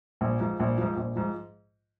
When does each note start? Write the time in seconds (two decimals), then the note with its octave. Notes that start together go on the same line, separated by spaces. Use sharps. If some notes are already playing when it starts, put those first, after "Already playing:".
0.21 A#1
0.40 G#2 F3
0.60 A#1
0.78 G#2 F3
0.97 A#1
1.16 G#2 F3